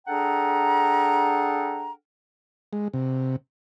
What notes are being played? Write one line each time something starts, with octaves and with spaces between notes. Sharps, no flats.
D4 G#4 A4 F#5 G5 A#5
G#3
C3